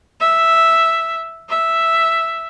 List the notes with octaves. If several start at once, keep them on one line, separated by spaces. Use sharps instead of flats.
E5
E5